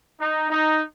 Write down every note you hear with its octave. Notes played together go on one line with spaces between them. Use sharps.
D#4
D#4